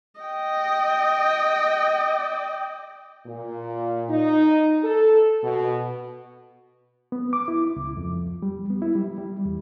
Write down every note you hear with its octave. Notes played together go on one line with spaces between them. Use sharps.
D#5 G5
A#2
D#4
A4
B2
B3
D6
E4
C#2
F2
G3
B3
E4
G3
G3
E2